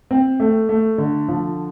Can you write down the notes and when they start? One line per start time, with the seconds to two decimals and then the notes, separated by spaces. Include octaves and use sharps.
0.11 C4
0.40 A3
0.69 A3
0.98 D3
1.28 F3